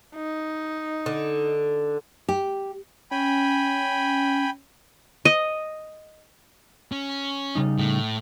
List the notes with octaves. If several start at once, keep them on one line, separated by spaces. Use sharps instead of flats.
D#4
D3
G4
C#4 G5 G#5 B5
D#5
C#4
C#3 G3 D#4
A2